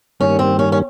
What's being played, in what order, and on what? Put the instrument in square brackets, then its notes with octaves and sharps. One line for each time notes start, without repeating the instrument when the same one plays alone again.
[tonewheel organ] G2 D#3 G3 A#3 [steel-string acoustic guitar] C#4
[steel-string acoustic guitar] C4
C#4
C#4